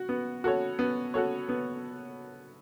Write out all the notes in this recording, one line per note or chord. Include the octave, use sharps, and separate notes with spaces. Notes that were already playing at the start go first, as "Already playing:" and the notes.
Already playing: F#4
B3
F#4 A4 C#5
B3
F#4 A4 C#5
B3